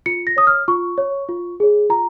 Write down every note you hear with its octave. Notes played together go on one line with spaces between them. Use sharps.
F4 C#7
A#6
C#5 D#6
F6
F4 C#6
C#5
F4
G#4 C#5
F4 A#5